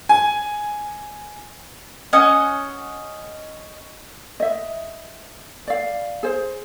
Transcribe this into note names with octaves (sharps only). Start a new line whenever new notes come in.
G#5
C#4 D#5 F#5
D#5 E5
D5 F5
G#4 C5